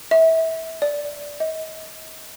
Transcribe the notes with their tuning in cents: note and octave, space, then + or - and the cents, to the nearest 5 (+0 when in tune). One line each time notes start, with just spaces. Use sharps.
E5 -25
D5 -10
D#5 +35